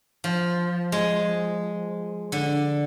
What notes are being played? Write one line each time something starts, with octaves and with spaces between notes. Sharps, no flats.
F3
G#3
D3